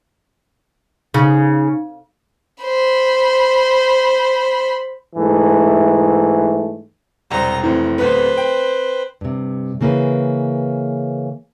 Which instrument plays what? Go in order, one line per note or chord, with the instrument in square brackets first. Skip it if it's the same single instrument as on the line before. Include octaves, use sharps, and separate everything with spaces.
[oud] C#3 [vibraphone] D#4
[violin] C5 B5
[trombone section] G#2 E3 A3
[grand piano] E1 C2 [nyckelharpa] C5 A#5
[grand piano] F1 E3 [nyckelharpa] C4
[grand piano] D1 B3 [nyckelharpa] B4 C5
[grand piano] G5
[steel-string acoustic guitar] G2 C3
C#3 E3 A#3 C#4 G#4 B4